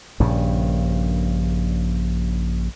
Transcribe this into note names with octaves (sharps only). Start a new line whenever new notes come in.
A#1 G2 C#3